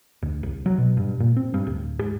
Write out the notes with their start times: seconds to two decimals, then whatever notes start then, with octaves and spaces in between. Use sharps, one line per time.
0.22 D2
0.43 C2
0.66 F#3
0.78 B2
0.97 G2
1.20 A#2
1.37 C4
1.54 G2
1.67 D1
2.01 G#2